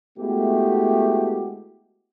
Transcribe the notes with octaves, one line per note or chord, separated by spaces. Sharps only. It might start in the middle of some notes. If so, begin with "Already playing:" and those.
G#3 A3 B3 E4 F#4 G4